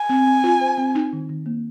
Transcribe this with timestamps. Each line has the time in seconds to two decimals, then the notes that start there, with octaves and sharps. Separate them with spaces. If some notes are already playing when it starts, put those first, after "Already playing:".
Already playing: G#5
0.09 C4
0.27 C4
0.44 F4
0.61 C5
0.78 C4
0.95 D#4
1.13 D#3
1.29 D#3
1.46 A#3